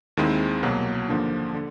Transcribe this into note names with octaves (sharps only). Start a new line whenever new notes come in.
D#2 D#3 G#3 C4 E4
C2 B2 F#3 A#3
D#2 D3 F3 A#3 D4
D3